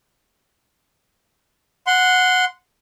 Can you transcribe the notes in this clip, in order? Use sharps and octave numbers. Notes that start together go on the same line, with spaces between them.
F#5 C6